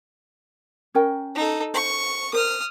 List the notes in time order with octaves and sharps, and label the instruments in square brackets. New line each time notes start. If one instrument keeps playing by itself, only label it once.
[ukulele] C#4 A#4 G5
[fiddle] D#4 A4
[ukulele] C5 [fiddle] C#6
[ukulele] A#4 C5 [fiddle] D#6 F6